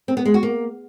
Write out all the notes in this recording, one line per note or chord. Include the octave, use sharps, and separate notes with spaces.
C4
B3
G#3
F#4
A#3